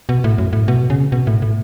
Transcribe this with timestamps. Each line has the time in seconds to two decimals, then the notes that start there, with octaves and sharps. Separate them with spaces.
0.09 B2
0.24 A2
0.38 F#2
0.53 A2
0.68 B2
0.90 C#3
1.12 B2
1.27 A2
1.42 A2